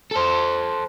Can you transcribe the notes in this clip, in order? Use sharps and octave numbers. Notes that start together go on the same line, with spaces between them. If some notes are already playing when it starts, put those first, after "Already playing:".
A4 C5